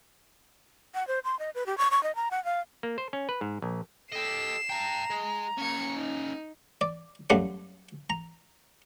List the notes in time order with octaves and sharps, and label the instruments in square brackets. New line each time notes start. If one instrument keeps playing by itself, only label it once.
[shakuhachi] F#5
C5
C6
D#5
B4
G4
C#6
C#6
D#5
A#5
F#5
F5
[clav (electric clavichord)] A#3
C5
C#4
B4
G#2
A#1
[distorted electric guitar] G4 D#5 [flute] A4 [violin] C7 E7
[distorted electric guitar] G5 A5 [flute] A#5
[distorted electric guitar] G#3
[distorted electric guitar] A#3 C#4 [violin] G#6 C#7
[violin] D#4
[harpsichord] D5
F#2 G3 A3 F5 F#5
A#5